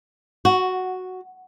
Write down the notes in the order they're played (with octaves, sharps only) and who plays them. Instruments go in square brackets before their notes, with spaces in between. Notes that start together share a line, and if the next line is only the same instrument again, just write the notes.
[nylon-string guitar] F#4